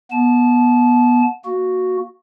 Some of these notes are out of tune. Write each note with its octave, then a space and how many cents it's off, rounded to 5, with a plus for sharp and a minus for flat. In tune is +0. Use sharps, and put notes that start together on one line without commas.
B3 -20 A5 -25
A#3 +0 F#4 +0